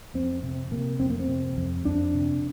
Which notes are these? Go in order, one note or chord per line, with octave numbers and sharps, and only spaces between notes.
F2 C4
C3 C4
C3 A#3
F2 C4
A#3
C4
C3
F2
F2 D4
C3